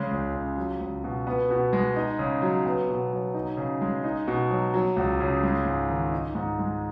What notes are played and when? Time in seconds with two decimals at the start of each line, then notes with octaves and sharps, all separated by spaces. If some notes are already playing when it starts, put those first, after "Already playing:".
Already playing: C#3 G#3
0.11 C#2
0.34 C#3
0.57 F#3
0.80 C#2
1.04 B2
1.27 B3
1.50 B2
1.73 G#3
1.96 D#4
2.19 C#3
2.42 F#3
2.65 B3
2.89 B2
3.12 F#3
3.34 D#4
3.57 C#3
3.81 G#3
4.04 D#4
4.27 B2
4.50 F#3
4.74 F#3
4.96 C#2
5.20 C#3
5.43 G#3
5.65 G#2
5.90 D#3
6.12 D#4
6.35 G#2
6.59 G#3